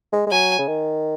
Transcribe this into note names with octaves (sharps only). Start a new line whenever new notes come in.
G#3
G#3
F#3 G#5
C#3
D#3